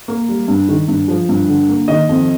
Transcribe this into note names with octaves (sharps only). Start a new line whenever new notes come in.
A#3
G3
G2
D#3
G2
F3
G2
D3
A#3
D#3 D#5
F2